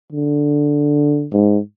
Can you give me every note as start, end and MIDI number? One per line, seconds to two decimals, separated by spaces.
0.13 1.27 50
1.33 1.59 44